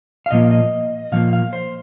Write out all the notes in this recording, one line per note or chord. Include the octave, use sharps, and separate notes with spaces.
F5
A#2 F3 A#3 D#5
D#5
A#2 F3 A#3 F5
F5
C5